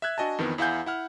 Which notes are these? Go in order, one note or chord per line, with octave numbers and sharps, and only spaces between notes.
E5 E6 F#6 G#6
D4 F#4 D#5 G#5 A5
F2 D#3 E3 B3
E2 E4 F5 F#5 G#5 G6
E4 F#5 F6